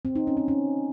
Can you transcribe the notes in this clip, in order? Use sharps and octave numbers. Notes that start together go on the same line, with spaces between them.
C4
D#4
C#4
C4
C#4